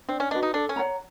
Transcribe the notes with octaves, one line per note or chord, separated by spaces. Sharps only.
C4 D4
C#4
D4 F#4 B4 D#5
D#4
D4 A4
C#4
C#5 F#5 A#5